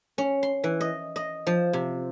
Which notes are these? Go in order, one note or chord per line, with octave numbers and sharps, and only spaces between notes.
C#4
C6
E3
D#5
D#5
F3
C3